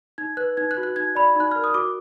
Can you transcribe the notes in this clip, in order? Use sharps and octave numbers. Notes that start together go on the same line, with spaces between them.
D#4 G#6
B4 F#6
D#4 G#6
F#6
F#4
F#6
D#4 G#6
D5 B5
D#4 F#6
A#4 F6
D#6
F#4 D6